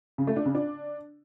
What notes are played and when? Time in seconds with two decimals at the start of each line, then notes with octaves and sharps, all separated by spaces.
0.18 C#3
0.27 A3
0.36 D4
0.46 C#3
0.55 D4